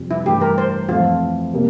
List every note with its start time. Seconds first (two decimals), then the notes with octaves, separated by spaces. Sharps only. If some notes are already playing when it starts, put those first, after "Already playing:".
Already playing: F2 C3 G3
0.11 E4
0.26 G2 E3 A3 G4
0.41 A#4
0.58 C5
0.88 F2 E3 A3 C4 E4 F4
1.53 C3 G3 A#3